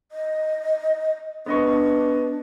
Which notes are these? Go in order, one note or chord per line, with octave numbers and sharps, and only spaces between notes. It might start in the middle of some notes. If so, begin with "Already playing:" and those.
D#5
B3 D4 D#5 C#6